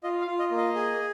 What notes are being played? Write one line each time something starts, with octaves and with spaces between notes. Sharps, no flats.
F4 D#5
F5
F4
D#5
A#3
D#5
G#4